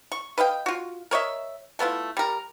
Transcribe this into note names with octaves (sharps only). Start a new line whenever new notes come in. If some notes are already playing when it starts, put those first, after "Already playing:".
C#6
B4 D#5 F5 G5
F4 F#4
A#4 C#5 D#5 E5
A3 B3 E4 F4
G3 A#4